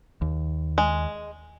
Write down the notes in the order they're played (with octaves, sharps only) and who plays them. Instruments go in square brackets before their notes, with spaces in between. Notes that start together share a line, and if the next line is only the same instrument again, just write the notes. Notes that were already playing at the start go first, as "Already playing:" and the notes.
[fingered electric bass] D#2
[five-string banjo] G#3